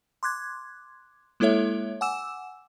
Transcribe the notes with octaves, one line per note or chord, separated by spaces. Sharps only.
C6 D6 F#6 G#6
G#3 A#3 E4 A4 C#5 E5
F#5 G#5 D6 E6 E7